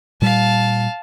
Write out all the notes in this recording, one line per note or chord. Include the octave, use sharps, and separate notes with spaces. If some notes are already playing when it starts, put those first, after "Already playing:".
A#2 G3 F5 A5